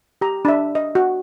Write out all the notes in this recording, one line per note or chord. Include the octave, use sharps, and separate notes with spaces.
G4 A#5
D4 E5
D#5
F#4